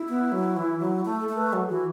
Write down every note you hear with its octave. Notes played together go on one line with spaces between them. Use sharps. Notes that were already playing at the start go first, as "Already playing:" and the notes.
Already playing: E4
B3
F#3
E3
F#3
A3
A4
A3
B4
F#3 A4
E3 F#4